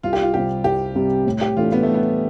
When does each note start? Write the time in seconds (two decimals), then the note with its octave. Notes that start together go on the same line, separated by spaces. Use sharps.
0.03 C2 F4
0.13 G4
0.22 F4
0.34 C3 G3 C4 G4
0.64 C2 G4
0.96 C3 G3 C4
1.26 A2
1.41 G4
1.56 E3 A3 D4 F4 A4
1.72 B3
1.83 A2 A3
1.94 B3